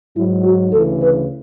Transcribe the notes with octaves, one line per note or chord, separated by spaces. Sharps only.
G#2 F#3 E4
F#4
D2 C#3 E3 A4
B4